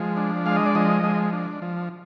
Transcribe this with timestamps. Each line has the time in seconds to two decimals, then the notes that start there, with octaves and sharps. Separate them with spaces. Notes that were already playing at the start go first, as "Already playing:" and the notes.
Already playing: F3 G#3
0.17 D4
0.46 G#3 F5
0.56 D#5
0.66 D5
0.75 F3 D#5
1.04 G#3
1.33 D4
1.62 F3